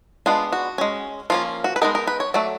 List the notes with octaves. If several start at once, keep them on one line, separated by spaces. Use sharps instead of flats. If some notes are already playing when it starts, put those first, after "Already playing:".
G#3 B3 D4 F4
F#4
G#3 C#4
F3 A#3 C#4 F4
F#4
B4
G#3 B3 D#4 A#4
A#4
B4
C#5
F#3 A3 D5